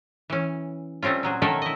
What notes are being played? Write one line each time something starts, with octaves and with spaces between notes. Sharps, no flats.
E3 C#4
G3 A3 C4 C#4 F4
A#2 F#3 G#4
B2 D#3 A3 A4 A#4 G#5
E4 D#5